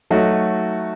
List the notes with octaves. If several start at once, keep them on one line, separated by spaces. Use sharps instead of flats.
F#3 A3 D#4 F#4